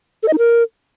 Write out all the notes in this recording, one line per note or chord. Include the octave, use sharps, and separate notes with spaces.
A4
D#5
D#4
A#4